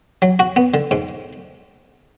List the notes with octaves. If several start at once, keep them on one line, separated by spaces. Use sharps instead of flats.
F#3
F#4
B3
D3
G#2